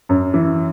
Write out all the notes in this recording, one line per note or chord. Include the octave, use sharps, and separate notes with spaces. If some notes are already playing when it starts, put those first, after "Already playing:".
F#2
E3